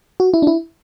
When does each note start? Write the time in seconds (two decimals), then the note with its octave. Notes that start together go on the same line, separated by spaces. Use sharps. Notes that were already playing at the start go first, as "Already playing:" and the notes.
0.20 F#4
0.34 E4
0.42 D4
0.47 E4